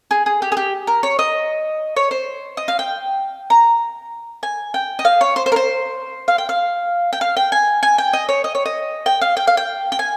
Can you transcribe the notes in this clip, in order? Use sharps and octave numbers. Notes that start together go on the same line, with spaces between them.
G#4
G#4
G4
G#4
G4
A#4
C#5
D#5
C#5
C5
D#5
F5
G5
A#5
G#5
G5
D#5
F5
C#5
C5
C5
A#4
C5
F5
G5
F5
G5
F5
G5
G#5
G#5
G5
D#5
C#5
D#5
C#5
D#5
G5
F5
G5
F5
G5
G5
G#5